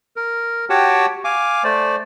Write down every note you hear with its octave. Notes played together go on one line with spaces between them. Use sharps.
A#4
F#4 G4 C#5 F#5 G5 A5
F5 G#5 D6
A3 C5 D5